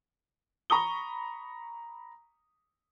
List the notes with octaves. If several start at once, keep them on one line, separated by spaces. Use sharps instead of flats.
A#5 B5 C#6 D#6 G7